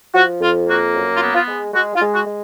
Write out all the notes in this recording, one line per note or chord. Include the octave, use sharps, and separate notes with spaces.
F3 F#4
F2 F4
A#3 F#4
F#2
F4
B3
F4
G#3
G#3 F#4
F4
G#3
F#4
G#3